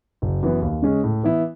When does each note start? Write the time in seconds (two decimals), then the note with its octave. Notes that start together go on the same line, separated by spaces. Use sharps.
0.22 F#1
0.42 F#2 E3 B3
0.62 D#2
0.82 C#3 G#3 C#4
1.04 A2
1.23 E3 B3 E4